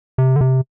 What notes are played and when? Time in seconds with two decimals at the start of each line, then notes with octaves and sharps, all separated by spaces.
0.18 C3
0.36 D3
0.41 C3